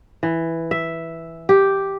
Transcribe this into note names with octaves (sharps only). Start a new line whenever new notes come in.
E3
E5
G4